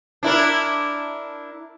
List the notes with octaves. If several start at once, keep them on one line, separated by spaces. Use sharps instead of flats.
D4 E4 A#4